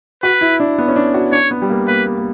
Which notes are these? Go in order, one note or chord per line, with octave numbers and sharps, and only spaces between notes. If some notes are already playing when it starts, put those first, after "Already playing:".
F#4 B4
E4
D4
B3
C#4
D4
F#4
D4 C#5
B3
G3
A#3
A#3 B4
B3
A#3